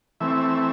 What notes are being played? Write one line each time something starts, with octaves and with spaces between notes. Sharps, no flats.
E3 A3 C4 E5